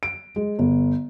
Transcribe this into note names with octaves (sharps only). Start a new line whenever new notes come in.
D7
G#3
G1